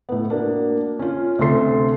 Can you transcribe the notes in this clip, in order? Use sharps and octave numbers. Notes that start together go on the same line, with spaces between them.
A2 B3
A#3 D4 F#4
C#4 F4
D2 C3 C4 A4 C6 C7